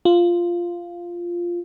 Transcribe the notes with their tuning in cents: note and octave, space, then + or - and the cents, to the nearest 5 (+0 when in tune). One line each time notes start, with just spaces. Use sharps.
F4 -5